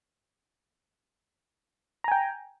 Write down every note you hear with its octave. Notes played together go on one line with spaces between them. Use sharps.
G5 G#5 A#5